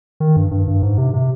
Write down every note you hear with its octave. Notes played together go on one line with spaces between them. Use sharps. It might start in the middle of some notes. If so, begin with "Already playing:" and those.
D#3
G2
G2
G2
G#2
C3
C3